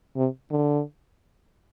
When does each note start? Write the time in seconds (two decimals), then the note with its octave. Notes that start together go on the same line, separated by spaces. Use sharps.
0.17 C3
0.51 D3